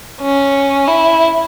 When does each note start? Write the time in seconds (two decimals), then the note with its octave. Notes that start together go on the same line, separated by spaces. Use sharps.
0.21 C#4
0.88 E4